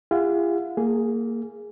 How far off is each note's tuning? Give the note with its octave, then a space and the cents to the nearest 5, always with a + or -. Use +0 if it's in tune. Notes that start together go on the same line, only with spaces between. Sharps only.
F4 -45 G#4 -45 F#5 -45
A#3 -15 G#4 +0